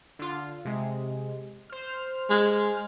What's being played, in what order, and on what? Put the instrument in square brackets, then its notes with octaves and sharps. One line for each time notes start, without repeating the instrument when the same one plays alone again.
[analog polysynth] D3 F4
C3 G#3
C5 F6
[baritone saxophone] G#3